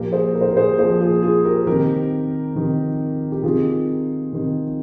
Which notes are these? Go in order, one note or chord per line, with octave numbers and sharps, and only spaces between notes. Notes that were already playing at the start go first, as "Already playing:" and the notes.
Already playing: A#2 F3 G4 A#4
G#4 C5
A#4
C5
G4 A#4
G#4 C5
A#2 F3 G#4 C5
F4 G#4
F4 G#4
G4 A#4
C3 D#3 G4 A#4
C3 D#3
G4
C3 D#3 F4 G#4
C3 D#3